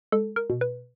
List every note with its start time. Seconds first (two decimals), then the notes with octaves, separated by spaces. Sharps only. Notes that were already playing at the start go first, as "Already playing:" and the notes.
0.12 G#3 A4
0.36 A#4
0.50 B2
0.61 B4